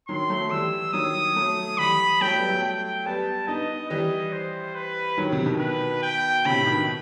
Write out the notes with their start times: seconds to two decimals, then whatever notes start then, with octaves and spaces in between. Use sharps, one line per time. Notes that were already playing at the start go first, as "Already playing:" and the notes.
0.08 D#3 F#3 C6
0.29 F#3 A3
0.51 E3 G3 E6
0.93 D#3 F#3 D#6
1.36 F#3 A3
1.78 E3 G3 B5
2.21 F#3 A3 G5
2.35 G3 B3
2.49 F#3 A3
2.63 G5
3.05 G3 B3 A5
3.48 B3 D#4 D#5
3.90 E3 G3 D#5
4.33 C5
4.75 B4
5.18 D#3 F#3
5.32 C3 E3
5.46 B2 D#3
5.60 B4
6.03 G5
6.45 A2 C3 B5
6.66 B2 D#3